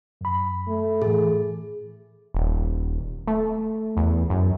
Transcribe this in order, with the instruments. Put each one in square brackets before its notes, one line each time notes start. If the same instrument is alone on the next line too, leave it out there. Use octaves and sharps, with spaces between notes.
[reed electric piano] F#2 B5
[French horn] A3
[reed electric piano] A2 E3 [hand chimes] G#4
[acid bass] D#1
A3
E2
F#2